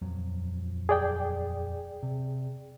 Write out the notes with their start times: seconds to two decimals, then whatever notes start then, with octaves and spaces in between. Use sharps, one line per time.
0.02 D#1 F2 F#3
0.89 G#4 D5 G5
2.03 C3